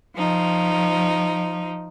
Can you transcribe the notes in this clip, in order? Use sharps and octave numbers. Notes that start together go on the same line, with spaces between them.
F3 D#4